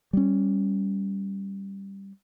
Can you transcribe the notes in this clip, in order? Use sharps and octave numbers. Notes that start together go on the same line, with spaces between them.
G3 C#4